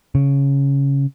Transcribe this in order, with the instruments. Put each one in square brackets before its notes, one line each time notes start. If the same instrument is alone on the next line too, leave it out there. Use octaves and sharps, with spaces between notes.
[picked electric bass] C#3